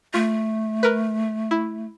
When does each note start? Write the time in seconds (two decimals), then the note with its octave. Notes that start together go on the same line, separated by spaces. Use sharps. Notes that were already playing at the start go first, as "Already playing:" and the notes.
0.14 A3 F4
0.83 A#4 B4
1.51 E4